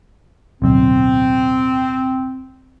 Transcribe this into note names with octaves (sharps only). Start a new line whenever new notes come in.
D1 B1 C4